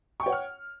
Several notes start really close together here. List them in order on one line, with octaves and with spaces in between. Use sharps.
C#6 G5 C#5 F#5 F6